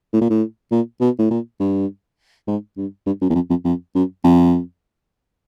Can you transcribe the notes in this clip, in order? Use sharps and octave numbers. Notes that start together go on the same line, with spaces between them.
A2
A#2
A2
A#2
B2
A2
A#2
G2
G#2
G2
G2
F#2
E2
F2
F2
F2
F#2
F2